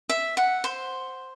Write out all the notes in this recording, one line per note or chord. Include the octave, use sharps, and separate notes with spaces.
E5
F#5
C5